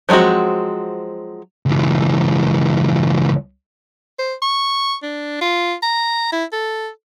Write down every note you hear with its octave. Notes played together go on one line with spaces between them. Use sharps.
F3 F#3 G#3 C4 F#4
C#2 E3
C5
C#6
D4
F4
A#5
E4
A4